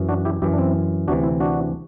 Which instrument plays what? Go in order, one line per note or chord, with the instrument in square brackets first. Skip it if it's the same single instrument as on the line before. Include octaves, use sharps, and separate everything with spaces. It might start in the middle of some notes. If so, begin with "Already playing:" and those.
Already playing: [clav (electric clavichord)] F#2 E3
D4 F#4
E4 G4
F#2 E3 E4 G4
D4
C4 E4
D2 C3 E3 D4 F#4
C4 E4
D4 F#4